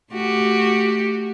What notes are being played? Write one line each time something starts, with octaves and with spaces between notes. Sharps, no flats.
A3 F#4 G4